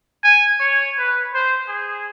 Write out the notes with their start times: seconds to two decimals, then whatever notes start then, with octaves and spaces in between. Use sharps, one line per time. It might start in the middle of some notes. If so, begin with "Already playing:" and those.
0.24 G#5
0.60 C#5
0.99 B4
1.34 C5
1.68 G#4